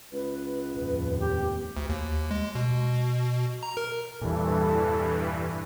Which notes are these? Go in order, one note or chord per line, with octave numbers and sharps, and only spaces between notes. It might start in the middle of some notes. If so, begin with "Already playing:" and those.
C#2 B4
F1 D#2 A2
G4
D2
D#2
G#3
B2
A#5
A#4
E2 G2 A#2 E3 A4